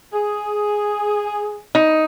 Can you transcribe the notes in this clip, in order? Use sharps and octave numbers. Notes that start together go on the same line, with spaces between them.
G#4
D#4